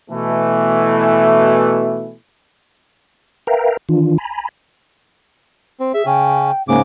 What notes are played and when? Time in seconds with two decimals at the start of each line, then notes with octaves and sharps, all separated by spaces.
0.11 B2 E3 A3
3.47 A#4 B4 E5 F5 G5 A#5
3.89 D#3 E3 D4 F4
4.18 G#5 A#5 B5
5.80 C4
5.94 G#4 E5
6.06 C#3 C#4 G5
6.68 G#2 C#3 A#3 D6